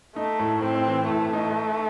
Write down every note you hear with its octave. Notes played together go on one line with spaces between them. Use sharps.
A3 D#4
A2
A2 C4
E3
A2 A3
D#4